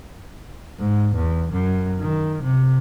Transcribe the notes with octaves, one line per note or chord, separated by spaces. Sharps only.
G#2
E2
F#2
D#3
C3